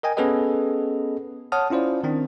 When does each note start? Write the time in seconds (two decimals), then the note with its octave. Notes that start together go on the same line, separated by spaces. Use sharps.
0.03 A#4 D#5 G5 G#5
0.17 B3 C#4 G#4 A4 B4 D#5
1.52 C#5 F#5 A5 D#6 F6
1.71 C#4 E4 F4 C5 D5
2.04 D#3 C4 D4